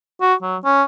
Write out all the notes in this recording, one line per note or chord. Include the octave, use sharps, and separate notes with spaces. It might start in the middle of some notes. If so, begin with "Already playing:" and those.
F#4
F#3
C#4